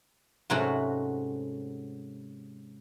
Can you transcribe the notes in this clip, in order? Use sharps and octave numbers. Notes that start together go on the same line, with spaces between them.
G#2 C3 F#3 A3 C#4 F#4